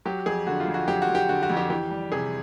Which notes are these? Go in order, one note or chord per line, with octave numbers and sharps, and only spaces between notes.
F#3 G4
F2 G#4
D3 F#4
F4
F2
F#4
F#3 G4
F#4
F2
G4
D3 F#4
F#4
F2
G4
E3 G4
G3
C3 G#4